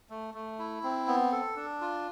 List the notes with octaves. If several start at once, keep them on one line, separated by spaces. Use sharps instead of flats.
A3
A3
E4
C4
B3
A4
D4
F4